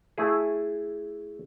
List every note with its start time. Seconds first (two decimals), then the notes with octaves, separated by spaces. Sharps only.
0.18 A3 E4 G#4